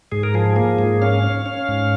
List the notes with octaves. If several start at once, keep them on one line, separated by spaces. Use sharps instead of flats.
G#2 G#4
A#4
F3 G#4
A#3 G#4
G#2
C#4 F5
C#4
C#4
G#2